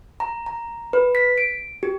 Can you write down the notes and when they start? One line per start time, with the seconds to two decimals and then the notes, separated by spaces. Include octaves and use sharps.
0.20 A#5
0.46 A#5
0.93 B4
1.15 B6
1.38 D7
1.83 G4